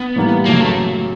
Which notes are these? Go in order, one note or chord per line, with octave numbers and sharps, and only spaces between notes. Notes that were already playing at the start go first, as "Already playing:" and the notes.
Already playing: B3
A2 E3 G3 A#3
F#2 C#3 F#3 A#3
A3